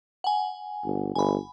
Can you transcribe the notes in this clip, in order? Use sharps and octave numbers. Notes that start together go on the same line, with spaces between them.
F#5 G#5
G1
G1 G#5 B5